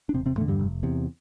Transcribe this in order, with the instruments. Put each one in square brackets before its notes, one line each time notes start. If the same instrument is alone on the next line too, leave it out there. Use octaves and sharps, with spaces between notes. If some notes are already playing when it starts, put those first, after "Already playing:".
[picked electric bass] D4
E1 C3 C4
C3 C4
E2 A2 A3
D3
G2 G3
F1
E2 C3